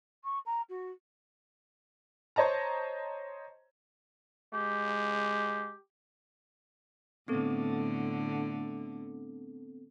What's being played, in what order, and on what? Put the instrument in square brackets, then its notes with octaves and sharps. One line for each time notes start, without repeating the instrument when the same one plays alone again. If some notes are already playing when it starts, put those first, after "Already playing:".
[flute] C#6
A#5
F#4
[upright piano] C5 C#5 D#5 A5 A#5
[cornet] G#3 [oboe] G4
[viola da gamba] A2 D3 [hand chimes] B3 C4 A4